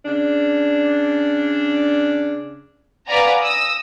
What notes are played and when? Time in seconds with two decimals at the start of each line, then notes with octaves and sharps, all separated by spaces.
0.05 C#3 D4
3.07 B4 D5 F5 F#5 G#5 A#5
3.41 D#6 E6 A#6